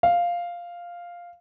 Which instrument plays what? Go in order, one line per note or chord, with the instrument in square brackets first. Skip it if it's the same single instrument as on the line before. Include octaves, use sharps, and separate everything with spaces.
[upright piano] F5